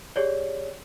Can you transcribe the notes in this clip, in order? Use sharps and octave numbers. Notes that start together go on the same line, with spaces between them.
G4 G#4 C#5 D5